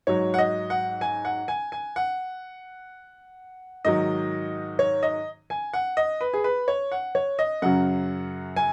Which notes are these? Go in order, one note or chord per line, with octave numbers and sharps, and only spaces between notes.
G#2 F#3 C#5
F#5
D#5
F#5
G#5
F#5
G#5
G#5
F#5
G#2 D#3 F#3 D#5
C#5
D#5
G#5
F#5
D#5
B4
G#4
B4
C#5
F#5
C#5
D#5
F#2 C#3 F#3 F#5
G#5